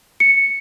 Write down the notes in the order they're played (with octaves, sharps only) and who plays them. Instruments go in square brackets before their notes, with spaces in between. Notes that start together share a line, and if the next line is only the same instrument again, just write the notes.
[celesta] C#7